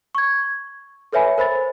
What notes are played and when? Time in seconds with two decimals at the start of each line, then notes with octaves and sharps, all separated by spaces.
0.15 C#6 G#6
1.13 A4 B4 C#5 E5 G#5 B5
1.38 A#4 C5 B5 A6